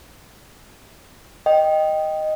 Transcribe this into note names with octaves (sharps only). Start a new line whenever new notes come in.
D#5 G5